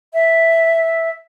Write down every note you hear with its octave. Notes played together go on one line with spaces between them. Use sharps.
E5